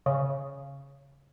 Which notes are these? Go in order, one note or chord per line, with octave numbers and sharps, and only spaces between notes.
C#3